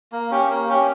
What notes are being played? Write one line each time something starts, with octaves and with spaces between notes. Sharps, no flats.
A#3
C#4 G4
A#3
C#4 G4